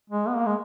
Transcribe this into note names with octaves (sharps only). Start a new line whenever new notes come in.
G#3
B3
A#3
G#3